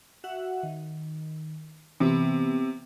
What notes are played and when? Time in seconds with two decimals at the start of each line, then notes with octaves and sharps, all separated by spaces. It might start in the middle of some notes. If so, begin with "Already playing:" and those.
0.24 F#4 E5 F#5
0.63 D#3
2.00 C3 E3 B3